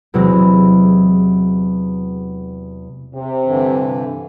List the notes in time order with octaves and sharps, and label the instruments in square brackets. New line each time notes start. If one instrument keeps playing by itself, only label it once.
[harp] E2 C3 F#3 G#3 C4
[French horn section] C3
[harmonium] G2 D3 E3